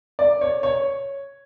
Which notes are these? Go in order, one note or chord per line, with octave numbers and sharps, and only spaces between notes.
D5
C#5
C#5